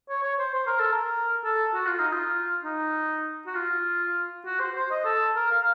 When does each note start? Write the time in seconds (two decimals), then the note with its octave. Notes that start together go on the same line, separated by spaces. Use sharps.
0.09 C#5
0.23 C#5
0.39 C5
0.54 C5
0.67 A#4
0.79 A4
0.92 A#4
1.45 A4
1.74 F#4
1.86 F4
1.99 D#4
2.13 F4
2.64 D#4
3.46 F#4
3.55 F4
4.46 F#4
4.60 C5
4.76 C5
4.91 D#5
5.05 A4
5.36 A#4
5.51 F5